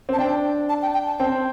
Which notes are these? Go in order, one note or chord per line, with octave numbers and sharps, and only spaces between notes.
C4 A5
D4 G5
A5
G5
G5
A5
C4 G5